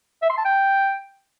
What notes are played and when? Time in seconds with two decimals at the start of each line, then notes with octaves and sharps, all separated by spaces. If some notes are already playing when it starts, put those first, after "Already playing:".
0.23 E5
0.30 C6
0.38 A5
0.45 G5